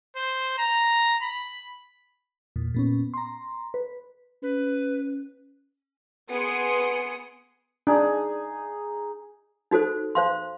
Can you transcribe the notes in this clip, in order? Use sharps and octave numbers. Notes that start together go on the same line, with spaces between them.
C5
A#5
B5
E2 A#2
A#2 B3 C#4
A#5 C6
B4
C#4 B4
B3 G#4 C6 D#6 C#7 D7
D4 D#4 G#4
D#4 F#4 A4 C5
C5 F5 C6